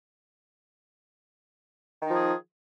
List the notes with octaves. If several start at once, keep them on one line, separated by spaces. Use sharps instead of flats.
D#3 F3 D#4 G#4